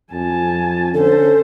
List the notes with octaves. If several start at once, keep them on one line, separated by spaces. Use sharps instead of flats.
F2 G#5 A5
D3 C#4 A4 C5